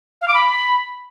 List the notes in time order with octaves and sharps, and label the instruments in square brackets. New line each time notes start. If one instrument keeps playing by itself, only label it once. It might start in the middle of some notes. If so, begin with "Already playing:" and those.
[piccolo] F5
D6
B5